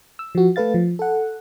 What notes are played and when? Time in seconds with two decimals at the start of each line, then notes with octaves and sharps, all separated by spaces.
0.19 E6
0.35 F3 F#4
0.56 A3 A4 B4 F5 A6
0.74 F3
0.99 A4 F#5